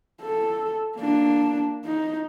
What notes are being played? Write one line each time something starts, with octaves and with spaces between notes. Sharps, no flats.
A4
A#3 D4
D#4